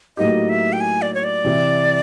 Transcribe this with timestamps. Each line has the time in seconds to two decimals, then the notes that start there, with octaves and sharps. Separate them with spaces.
0.17 A2 F#3 A#3 D#4 G4 D#5
0.49 E5
0.73 G5
0.81 G#5
1.02 D5
1.14 C#5
1.24 D5
1.44 C3 E3